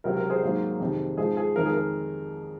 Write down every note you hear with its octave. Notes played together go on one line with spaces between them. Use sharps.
C#2 C3 F#3 C4 A#4
A#4
G#4 C5
G#2 F#3 A#3
F2 C3 D#3
G#2 F3 G#3 G#4 C5
G#4
F2 D#3 G#3 A#4
G#4
A#4